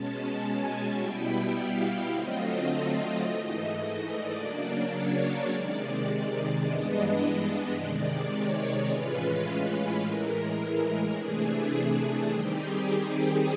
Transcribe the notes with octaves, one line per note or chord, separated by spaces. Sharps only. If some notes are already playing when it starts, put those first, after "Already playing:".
Already playing: B2 G#3 C#4 A5
G#5
B2 G3 B3 E4 G5
F5
D3 F#3 A3 C4 F4 D#5
G#2 E3 A3 D#5
D5
C#3 F#3 A#3 D4
C#5
C3 D#3 G#3 D5
G2 E3 G#3 B3 D4 D#5
C3 D#3 G#3 D5
C#5
A2 E3 G#3 C#4 F4 B4
B4
A2 E3 G#3 A#4
C3 E3 A3 D4 G#4
D#3 G3 C4 D#4 G4
G#4
G#4